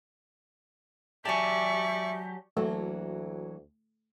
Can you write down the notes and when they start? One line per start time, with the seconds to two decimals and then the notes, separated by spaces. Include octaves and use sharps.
1.25 F#3 G4 D5 E5 G#5 A5 C#6
2.57 D2 E3 F#3 A3 A#3